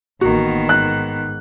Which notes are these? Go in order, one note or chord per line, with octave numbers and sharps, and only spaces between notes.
A1 D#3 A#3 B3 F#4
G#2 F#6